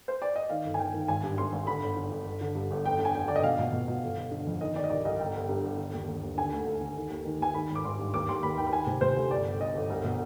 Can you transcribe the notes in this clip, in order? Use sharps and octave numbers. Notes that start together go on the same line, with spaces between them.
C5
D5
D#5
D#3 F5
G1
G#5
D#3 G5
D#3
G#1 G#5
G2
G#1 C6
G#1
D3 B5
G1
D3
G1
G1
D3
G2
G1
F1 G5
D3
G#5
F1 G5
D3 D5
D#5
B2 F5
B2
B2
B2
G1
G1
D3
F2
D#3 D#5
D#3 D5
D#5
C2 D5
C2 D#5
G1 G5
G1
G2
G1
D3
D#2
D#2
D#2
D3 G#5
D2
D2
D3
D#3
D#2
D#3
D#2 G#5
D#3 B5
G#1
D6
G#1 C6
G2
D#2 D6
D#2 C6
D#2 B5
D#3 G5
B5
D#3 G#5
C3
C3 C5
D2
G1 D5
G1
G1 D#5
G1
C2
B2